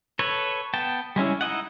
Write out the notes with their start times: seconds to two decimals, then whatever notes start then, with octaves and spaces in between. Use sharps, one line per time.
0.19 A4 B4 C#5
0.74 B3 G5 A5
1.16 G3 G#3 C#4 E4
1.41 D#4 E4 D#5 F#5